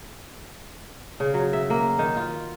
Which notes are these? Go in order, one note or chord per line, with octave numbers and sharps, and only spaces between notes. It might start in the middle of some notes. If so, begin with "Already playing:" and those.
C#3
F#3
E5
A#3
D#3
F4